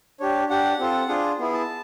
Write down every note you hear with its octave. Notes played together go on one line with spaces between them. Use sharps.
D4 G4 C#5
D4 G4 F#5
C4 F4 A4
D4 F4 G#4
B3 E4 G#4
A5